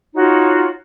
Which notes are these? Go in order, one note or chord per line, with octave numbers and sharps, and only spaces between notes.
D#4 F4 F#4 C#5